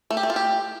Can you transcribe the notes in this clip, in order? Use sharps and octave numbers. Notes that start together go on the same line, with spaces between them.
A3
G4
A3
F4
G4